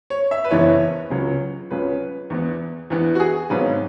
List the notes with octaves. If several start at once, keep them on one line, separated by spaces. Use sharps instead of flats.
C#5
E5
B4
F#1 E2 E3 B3 E4 C#5
C#2 C#3 F#3
C#2 C#3 F#3 B4
E2 E3 B3
E2 E3 B3
F#4
G#4
G#1 G#2 F#3 B3 B4